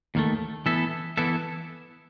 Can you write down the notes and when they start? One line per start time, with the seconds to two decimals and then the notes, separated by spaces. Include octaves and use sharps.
0.15 D#2 D#3 A3
0.66 E3 B3 E4 A4 E5
1.17 E3 B3 E4 A4 E5